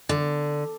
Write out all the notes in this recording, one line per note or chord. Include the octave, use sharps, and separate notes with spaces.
D3